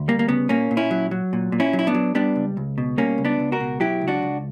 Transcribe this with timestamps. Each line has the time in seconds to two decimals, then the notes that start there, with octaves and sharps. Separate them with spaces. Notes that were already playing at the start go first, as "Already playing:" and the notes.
Already playing: D2
0.08 G3 A#3
0.19 A#3
0.28 C#3 B3
0.49 A#2 A#3 C#4
0.71 A#2
0.77 C#4 E4
0.91 F#3
1.11 F#3
1.33 A#2
1.52 A#2
1.60 C#4 E4
1.73 F#3
1.79 E4
1.87 B3 D4
1.94 F#3
2.15 G3 B3 D4
2.36 C#2
2.57 C#2
2.78 B2
2.98 G3 A#3 C#4
3.18 C#2
3.25 B3 D4
3.40 C#2
3.52 F#4 A#4
3.60 B2
3.80 F#3 E4 G4
4.01 C#2
4.08 D4 F#4
4.22 C#2